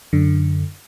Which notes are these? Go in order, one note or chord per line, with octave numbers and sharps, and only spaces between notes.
F#2 D3